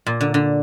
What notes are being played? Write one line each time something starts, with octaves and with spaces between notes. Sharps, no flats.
A#2
D3
D3